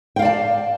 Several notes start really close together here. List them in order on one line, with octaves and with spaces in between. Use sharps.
G5 F5 D5 A5